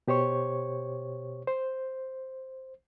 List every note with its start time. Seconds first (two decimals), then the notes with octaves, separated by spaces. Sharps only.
0.08 B2 G4 C5 C#5 C#6
1.47 C5